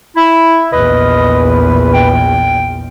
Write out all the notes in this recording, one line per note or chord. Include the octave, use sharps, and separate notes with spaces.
E4 E5
A#1 E2 B4 D#5
G5